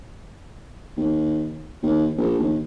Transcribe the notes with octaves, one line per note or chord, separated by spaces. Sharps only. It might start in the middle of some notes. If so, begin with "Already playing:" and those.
D#2
D#2
A#1
D#2